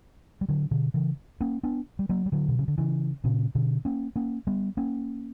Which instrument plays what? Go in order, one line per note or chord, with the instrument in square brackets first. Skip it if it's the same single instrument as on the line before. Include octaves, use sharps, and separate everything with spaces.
[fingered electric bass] G3
D3 F#3
B2 D3
C#3 E3
A#3 C#4
B3 D4
G3
F#3 A#3
G3
D3 F#3
B2
C#3
D3
C#3 E3
A#2 C#3
B2 D3
A#3 C#4
A#3 C#4
G3 B3
A#3 C#4